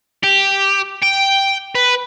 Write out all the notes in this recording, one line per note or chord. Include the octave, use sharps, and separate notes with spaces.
G4
G5
B4